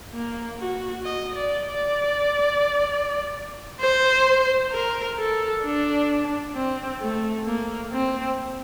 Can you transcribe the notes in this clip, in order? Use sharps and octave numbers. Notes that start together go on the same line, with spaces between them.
A#3
F#4
D#5
D5
D5
C5
A#4
A4
D4
C4
A3
A#3
C4